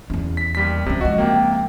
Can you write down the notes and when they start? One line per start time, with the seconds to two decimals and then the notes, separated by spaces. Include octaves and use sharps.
0.10 E2 C#4
0.37 B6
0.55 D#2 G3 B6
0.86 C3 C4 C#4
1.01 C#2 F3 F#4 D#5
1.18 C3 A#3 G5